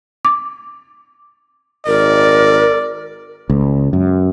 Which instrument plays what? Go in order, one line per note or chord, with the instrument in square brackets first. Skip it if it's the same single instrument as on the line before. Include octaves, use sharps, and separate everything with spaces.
[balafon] D6
[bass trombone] G#1 [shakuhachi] A#4 [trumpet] D5
[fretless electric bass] C#2
F#2